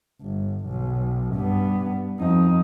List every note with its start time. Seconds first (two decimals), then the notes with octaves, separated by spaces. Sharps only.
0.21 G1
0.66 B1
1.34 G2 B3
2.19 F2 D#4